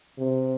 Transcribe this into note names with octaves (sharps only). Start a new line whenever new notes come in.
C3